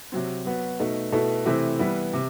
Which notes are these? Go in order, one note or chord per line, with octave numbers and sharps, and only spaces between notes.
C3 F#3 C4
F#3 B3 F#4
B2 A3 D#4
B2 A3 E4 A4
C3 E3 A3 C4 E4
E3 G3 B3 E4
C3